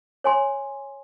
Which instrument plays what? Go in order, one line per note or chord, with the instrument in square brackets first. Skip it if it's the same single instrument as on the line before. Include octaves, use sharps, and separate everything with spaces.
[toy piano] C#5 G#5 C6